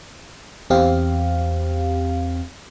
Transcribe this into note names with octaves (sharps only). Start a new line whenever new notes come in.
E2 C4 G4 F5